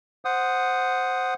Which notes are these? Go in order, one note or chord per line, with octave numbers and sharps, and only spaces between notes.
C5 F#5 D#6